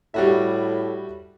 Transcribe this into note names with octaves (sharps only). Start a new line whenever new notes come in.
A2 G3 F#4 E5